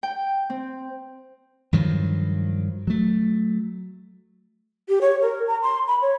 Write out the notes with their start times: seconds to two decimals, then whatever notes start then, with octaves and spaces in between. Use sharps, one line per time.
0.03 G5
0.50 C4
1.73 G2 D#3 F3 F#3
2.87 F#3 A3
4.89 G4
5.01 C#5
5.22 A#4
5.47 A#5
5.62 C6
5.87 B5
6.02 C#5